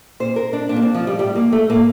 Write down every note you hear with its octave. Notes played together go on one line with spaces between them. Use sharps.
A#2 C5
A#4
D4
A#2 D4
A#3
C4
F3
G3
A2 G3
A#3
A3
A2 A#3